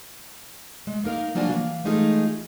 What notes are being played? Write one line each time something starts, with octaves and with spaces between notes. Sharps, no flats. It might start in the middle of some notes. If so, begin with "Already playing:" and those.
G#3
A#3 D#4 A#4 F5
F3 F#3 A#3 D4 F4 G#5
E3 A#3
E3 G#3 A3 D#4 F4 G#4